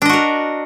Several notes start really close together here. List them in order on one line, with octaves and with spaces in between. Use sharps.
D4 D#5 F#4 A#4